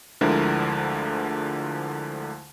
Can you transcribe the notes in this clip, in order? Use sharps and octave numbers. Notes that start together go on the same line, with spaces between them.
D2 D3 F3 G#3 E4 A#4